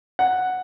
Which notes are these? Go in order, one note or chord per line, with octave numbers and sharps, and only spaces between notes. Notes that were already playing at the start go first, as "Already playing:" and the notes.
F#5